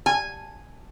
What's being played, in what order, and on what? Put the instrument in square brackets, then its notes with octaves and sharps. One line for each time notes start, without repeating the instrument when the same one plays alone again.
[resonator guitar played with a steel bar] G#5